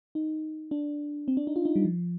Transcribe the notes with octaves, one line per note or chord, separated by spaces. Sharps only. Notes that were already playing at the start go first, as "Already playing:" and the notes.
D#4
D4
C4
D4
D#4
F4
D#4
G3
F3